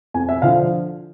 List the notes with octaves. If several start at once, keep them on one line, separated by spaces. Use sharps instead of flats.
F2 G#5
E5
D3 F3 F5